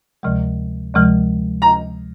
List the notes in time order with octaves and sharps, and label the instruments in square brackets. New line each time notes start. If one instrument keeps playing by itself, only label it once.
[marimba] D2 C3 F3 G#3
D2 C3 F3 G#3
[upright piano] A#5